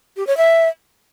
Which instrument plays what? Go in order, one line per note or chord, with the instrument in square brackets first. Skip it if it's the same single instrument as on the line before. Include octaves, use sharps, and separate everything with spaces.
[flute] G4
C#5
E5